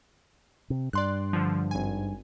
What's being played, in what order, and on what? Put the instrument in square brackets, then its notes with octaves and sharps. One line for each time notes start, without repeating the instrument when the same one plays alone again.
[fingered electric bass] C3
[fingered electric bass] G2 [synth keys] D5 C6 F#6
[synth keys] D3 F3
G#1 G#5